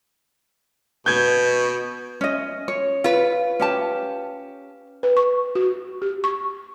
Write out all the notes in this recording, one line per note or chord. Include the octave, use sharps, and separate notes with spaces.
B2 G6 G#6
C#4 D#5
C#5
F4 B4
C#4 G4 A5
B4
C#6
F#4
G4
C#6